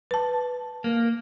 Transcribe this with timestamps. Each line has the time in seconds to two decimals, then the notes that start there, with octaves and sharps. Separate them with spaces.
0.11 B4 A5
0.84 A#3